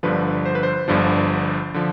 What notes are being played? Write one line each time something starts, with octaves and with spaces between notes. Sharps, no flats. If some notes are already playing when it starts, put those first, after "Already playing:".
G1 G2 D3 F3 B4
C5
B4
C5
G1 G2 D3 F3
D3 F3